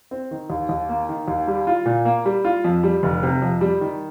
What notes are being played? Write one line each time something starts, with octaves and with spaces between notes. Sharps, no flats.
C4
D#3
D#2
D#2
A#3
D#3
D#2
G3
F4
A#2
A#3
G3
F4
F2
G3
F1
C3
F2
G3
D#3